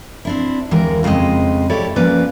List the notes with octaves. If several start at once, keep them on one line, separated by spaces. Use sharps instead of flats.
C4 D4 E4
D#2 E3 G#3 A#4
F2 C#3 G#3 C4 D#5
E4 G4 A4 C#5 D5
F3 A#3 C#4 B4 D5